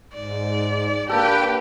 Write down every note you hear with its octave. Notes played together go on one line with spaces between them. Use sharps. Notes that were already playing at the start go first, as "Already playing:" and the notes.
G#2 D5
A#3 D4 G4 A4 B4 G5